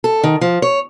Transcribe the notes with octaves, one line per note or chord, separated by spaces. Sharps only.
A4
D#3
F3
C#5